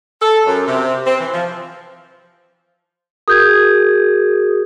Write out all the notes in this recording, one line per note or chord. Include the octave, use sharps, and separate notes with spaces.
A4
F#2
C3
C4
E3
F3
F#4 G#4 A#4 D#6 G6 G#6